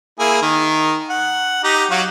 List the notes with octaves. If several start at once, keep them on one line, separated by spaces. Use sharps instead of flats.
A#3 E4 G#4
D#3 A#4
F#5
D#4 G4 A#5
F#3 F#4 F5